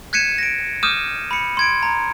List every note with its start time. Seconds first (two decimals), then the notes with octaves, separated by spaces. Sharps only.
0.13 F#6 G#6 B6 C#7 D#7 E7
0.38 A#6 D7
0.83 D6 D#6 F6 G6 D#7 E7
1.31 B5 C#7
1.57 C6 G#6 D7
1.83 A#5